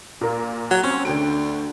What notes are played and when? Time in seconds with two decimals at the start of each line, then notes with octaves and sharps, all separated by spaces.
0.21 A#2 A#3 A#4
0.71 F#3
0.83 C4 C#4
1.05 D2 D3 G5 D7